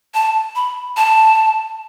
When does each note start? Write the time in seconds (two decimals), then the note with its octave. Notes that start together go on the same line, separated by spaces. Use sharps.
0.14 A5
0.55 B5
0.97 A5